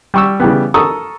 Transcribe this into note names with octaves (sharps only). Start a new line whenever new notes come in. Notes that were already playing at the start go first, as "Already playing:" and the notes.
G3 C#6 E6
C#3 E3 G3 B3
A4 A#4 A#5 C#6 D#6 E6